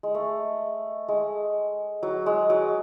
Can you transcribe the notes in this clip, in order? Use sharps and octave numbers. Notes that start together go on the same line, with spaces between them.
G#3
A3
G#3
F#3
G#3
F#3